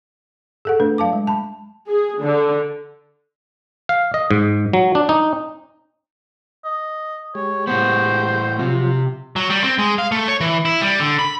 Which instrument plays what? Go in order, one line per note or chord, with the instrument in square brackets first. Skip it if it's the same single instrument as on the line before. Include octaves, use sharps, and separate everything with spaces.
[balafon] G#4 A4 F#5
A3 D4 B4
F#3 F5 A5 D6
G#3
A5 B5
[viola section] G#4
D3
[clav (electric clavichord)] F5
D#5
G#2
F#3
D4
D#4
[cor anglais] D#5
[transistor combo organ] G#3 G4 [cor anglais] C#5
[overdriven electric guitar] A2 B3 [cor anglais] C5
[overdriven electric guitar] C3 [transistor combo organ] F3 F#3 F4
[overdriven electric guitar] F#3
G3
C4
G#3
F5
A3
C#5
E3
E4
G3
D3
B5